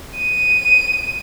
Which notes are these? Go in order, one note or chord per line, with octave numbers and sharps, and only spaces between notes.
D#7